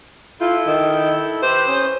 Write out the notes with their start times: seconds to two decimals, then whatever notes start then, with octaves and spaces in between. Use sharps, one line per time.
0.41 E4 F4 A4 G6
0.67 D#3
1.43 G4 B4 C5
1.67 C#4 D#6